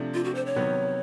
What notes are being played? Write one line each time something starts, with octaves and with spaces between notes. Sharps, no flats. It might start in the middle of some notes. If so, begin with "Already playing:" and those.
Already playing: C3 F3 A3 D4
F4
F#4
C5
C#5
C3 D#3 F#3 B3